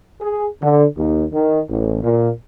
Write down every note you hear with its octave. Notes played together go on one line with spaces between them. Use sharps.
G#4
D3
D#2
D#3
A1
A#2